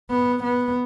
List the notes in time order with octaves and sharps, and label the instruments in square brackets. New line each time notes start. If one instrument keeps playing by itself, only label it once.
[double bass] B3
B3